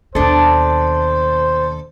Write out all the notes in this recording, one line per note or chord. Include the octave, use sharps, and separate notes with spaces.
D#2 B2 D4 A4 C5